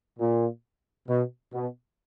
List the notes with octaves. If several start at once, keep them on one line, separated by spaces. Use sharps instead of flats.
A#2
B2
B2